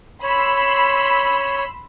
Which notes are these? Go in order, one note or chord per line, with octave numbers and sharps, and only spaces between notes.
C#5 B5 C6 E6